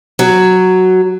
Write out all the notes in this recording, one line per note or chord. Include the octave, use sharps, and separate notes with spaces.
F#3